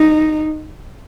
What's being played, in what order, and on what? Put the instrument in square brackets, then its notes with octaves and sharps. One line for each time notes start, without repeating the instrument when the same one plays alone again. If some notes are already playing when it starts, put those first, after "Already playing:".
Already playing: [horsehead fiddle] D#4